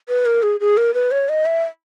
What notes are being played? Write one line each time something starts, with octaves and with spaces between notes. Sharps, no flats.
B4
A#4
G#4
G#4
A#4
B4
C#5
D#5
E5